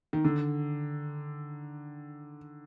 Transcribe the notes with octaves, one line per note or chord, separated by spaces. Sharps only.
D#3
D3